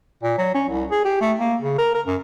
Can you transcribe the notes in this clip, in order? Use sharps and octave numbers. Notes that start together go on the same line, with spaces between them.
A#2
F#3
C#4
C2
G#4
G4
A3
A#3
C#3
A#4
A#4
F#2